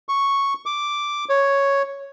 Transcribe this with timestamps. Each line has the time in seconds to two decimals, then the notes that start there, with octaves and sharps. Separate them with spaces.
0.09 C#6
0.66 D6
1.29 C#5